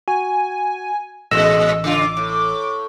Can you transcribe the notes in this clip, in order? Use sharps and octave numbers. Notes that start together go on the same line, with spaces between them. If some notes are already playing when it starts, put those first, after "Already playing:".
F#4 G#5
A1 A#2 G#3 D#5 E6
C#3 F4 D6
A2